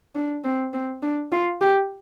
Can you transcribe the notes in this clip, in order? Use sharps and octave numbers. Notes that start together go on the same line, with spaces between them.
D4
C4
C4
D4
F4
G4